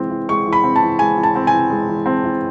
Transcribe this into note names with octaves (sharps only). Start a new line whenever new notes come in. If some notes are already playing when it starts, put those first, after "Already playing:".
Already playing: E3 G#3 C4
E3
G#3 C#6
E3
B5
C4
A5
E3
G#3 G#5
E3
A5
C4
E3 G#5
G#3
E3
C4
E3